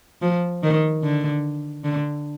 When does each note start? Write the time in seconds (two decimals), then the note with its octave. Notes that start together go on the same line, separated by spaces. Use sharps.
0.22 F3
0.63 D#3
1.03 D3
1.84 D3